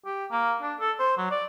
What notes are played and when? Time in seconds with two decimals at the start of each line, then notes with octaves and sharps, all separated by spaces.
0.05 G4
0.31 A#3
0.62 D4
0.80 A4
0.99 C5
1.18 F#3
1.31 D5